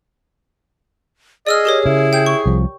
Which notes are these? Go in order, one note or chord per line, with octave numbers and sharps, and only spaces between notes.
G#4 D5 D#5 E6 F6
G4 A#4 C#5
C#3 E4
G5 G6
C#6
C2 F3